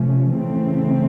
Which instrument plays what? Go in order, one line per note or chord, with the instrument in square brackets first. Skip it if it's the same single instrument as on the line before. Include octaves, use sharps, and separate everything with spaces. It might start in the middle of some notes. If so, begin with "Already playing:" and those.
Already playing: [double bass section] C3 F3 A3 C#4
C#3 E3 A3 C4